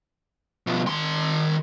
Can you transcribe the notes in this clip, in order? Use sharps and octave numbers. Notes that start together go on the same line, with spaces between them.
B2 F3
D#3 C6